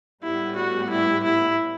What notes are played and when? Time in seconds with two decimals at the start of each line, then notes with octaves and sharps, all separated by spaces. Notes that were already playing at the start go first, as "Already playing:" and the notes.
0.23 A2 G3 B3 E4
0.57 F#4
0.90 E4
1.24 E4